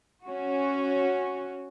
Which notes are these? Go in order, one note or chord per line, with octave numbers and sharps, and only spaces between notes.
C#4 F#4